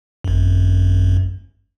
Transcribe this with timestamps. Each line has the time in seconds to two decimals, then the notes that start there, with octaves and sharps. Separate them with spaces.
0.24 G#1 F#2